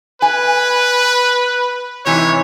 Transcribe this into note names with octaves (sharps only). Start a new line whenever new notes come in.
B4 G#5
G#2 C3 E3 C#5